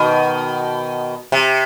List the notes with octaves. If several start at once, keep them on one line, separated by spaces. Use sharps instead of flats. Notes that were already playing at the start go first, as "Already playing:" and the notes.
Already playing: B2 D#3
C3